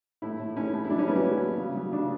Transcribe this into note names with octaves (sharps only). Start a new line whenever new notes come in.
A2 E4
A2
A2 C#4
A2
E4
F#3 D4
C#4
F#3 B3
C#4
F#3
F#3
C#3
F#3
C#3 D4